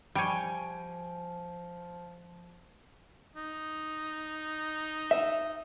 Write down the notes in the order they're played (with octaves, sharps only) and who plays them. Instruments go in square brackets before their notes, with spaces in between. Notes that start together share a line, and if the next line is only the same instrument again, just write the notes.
[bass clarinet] F3 [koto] G3 C#5 [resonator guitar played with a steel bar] G5 G#5
[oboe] D#4
[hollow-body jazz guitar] E5